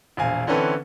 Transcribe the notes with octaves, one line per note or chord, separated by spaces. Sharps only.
E1 A#1 F5 G#5
D3 E3 C4 C#4 A4 B4